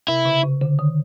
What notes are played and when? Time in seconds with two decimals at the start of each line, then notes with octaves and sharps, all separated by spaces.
0.08 C3 E4
0.25 C#3
0.43 C#3
0.61 D3
0.79 D#3